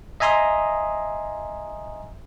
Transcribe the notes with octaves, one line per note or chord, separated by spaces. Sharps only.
D#5 E5 G#5 A#5 C6 D#6